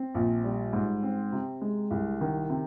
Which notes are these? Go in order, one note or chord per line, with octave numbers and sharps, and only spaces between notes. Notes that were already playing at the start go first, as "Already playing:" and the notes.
Already playing: C4
A#1
G3
G#2
C4
C3
G#3
C2
D#3
C3